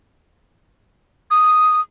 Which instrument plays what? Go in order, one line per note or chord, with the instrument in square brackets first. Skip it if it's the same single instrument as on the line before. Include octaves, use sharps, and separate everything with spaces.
[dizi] D#6